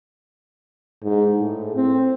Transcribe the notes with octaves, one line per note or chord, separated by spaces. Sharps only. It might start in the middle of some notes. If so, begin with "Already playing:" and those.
G#2
A2
C4